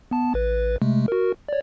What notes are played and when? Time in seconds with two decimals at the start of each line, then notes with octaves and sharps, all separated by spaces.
0.11 B3 A5
0.34 A1 B4
0.82 C3 G#3 A3
1.08 F#4 A#4
1.49 C#5 D5